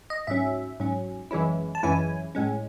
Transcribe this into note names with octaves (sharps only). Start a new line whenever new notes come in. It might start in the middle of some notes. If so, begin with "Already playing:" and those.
D#5
G#2 F#3 C#4 E5
G#2 F#3 C#4
F#2 E3 G#3 C#4 E4
A5
F#2 E3 G#3 C#4 E4 G#5
A2 G#3 C#4